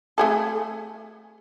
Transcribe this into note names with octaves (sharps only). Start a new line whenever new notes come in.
A3 G#4 A4